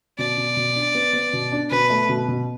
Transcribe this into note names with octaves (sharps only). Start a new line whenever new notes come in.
B2 D5
B2
B2
D4
B3
B3
B2
D4
B2 B4
A3
B2
B2